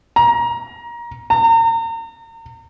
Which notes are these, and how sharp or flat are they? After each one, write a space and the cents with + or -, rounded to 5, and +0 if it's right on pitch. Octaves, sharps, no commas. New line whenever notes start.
A#5 +25
A#5 -35